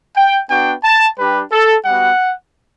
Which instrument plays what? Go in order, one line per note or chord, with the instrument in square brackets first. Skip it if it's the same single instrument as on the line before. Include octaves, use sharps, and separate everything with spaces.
[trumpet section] G5
B3 D4 F#4 G5
A5
G3 D4 G4 B4
A4
G3 B3 F#4 F#5